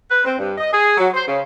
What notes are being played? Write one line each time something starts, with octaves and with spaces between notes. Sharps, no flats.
B4
C4
G2
D#5
G#4
F#3
C5
C#3